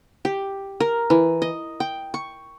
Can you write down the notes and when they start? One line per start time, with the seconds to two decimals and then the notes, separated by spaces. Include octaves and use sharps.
0.25 G4
0.80 A#4
1.10 E3
1.42 D#5
1.80 G5
2.14 C#6